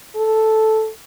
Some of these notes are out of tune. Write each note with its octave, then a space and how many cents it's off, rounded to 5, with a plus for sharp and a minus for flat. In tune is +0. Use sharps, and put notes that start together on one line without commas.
A4 -5